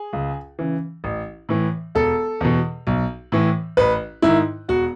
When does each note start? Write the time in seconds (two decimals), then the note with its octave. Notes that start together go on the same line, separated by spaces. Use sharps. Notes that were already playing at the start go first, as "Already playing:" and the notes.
Already playing: G#4
0.13 C#2
0.59 C#3 E3
1.04 A1
1.49 A2 E3
1.95 E1 A4
2.41 E2 B2
2.87 B1
3.32 A2 E3
3.77 A1 B4
4.22 G#2 D#3 E4
4.68 E1 F#4